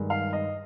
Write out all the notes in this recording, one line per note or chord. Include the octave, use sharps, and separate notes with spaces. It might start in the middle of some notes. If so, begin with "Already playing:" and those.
Already playing: G2 D#3 G#3
F5
D#5